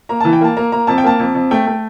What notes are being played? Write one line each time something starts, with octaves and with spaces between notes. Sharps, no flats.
A#3 A#5
E3 A5
G5
A#3 A5
A#3 A#5
A#3 A#5
F2 A5
G5
A#3 A5
F2
F2
A3 G5
A3